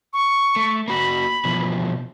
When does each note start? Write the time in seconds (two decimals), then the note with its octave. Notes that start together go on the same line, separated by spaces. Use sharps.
0.13 C#6
0.56 A3
0.88 A#3 F#4 B5
1.45 B2 E3 F3